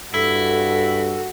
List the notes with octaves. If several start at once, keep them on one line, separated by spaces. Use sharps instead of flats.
G2 E4 F#4 A4